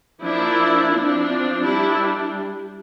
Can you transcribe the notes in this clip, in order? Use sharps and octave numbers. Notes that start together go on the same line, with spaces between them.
F3 A#3 D4 E4
F3 C4 D4
G3 D4 E4